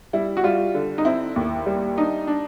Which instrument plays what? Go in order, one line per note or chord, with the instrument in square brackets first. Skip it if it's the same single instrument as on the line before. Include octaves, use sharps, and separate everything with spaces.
[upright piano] G3 E4
F#4
G3 F4
D3
D#4
C4 E4
D#2
G3
D4 D#4
D4